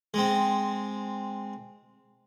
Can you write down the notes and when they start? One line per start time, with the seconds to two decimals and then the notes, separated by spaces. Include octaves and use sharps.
0.14 G#3 C4